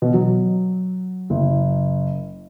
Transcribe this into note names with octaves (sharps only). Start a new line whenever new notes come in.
B2
F#3
F#1